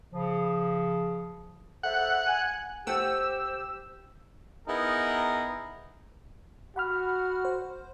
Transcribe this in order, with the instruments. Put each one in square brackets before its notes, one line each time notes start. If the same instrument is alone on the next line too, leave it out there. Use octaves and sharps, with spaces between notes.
[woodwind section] C#3 F3
[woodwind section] A4 C5 E5 [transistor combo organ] F#5
[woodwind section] G#5
[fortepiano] A3 F#5 G5 [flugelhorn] G4 [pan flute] C5 [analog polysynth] E6
[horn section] B3 D#4 E4 G#4 A#4
[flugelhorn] F#4 [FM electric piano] F#5 B5 F6
[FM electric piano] C5